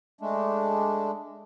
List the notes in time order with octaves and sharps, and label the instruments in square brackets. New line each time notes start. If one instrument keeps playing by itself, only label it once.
[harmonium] G#3 A3 D4